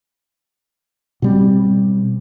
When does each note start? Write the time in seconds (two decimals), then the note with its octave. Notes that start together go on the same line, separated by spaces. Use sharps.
1.22 B2 G3 C4